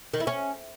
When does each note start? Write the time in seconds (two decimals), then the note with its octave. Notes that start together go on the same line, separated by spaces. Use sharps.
0.14 D#3
0.20 E4
0.27 C#4